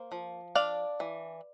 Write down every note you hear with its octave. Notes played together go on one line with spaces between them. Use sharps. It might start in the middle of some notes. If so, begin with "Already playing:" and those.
Already playing: A#3 C5
F3
D4 D5 F5
E3